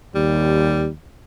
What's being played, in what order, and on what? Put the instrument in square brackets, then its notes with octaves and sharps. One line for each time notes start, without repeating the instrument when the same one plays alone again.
[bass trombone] D#2 [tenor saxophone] G3